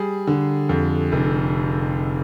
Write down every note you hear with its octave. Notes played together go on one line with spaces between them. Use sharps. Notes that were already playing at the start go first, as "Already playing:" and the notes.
Already playing: G3 G#4
D3
F2
F1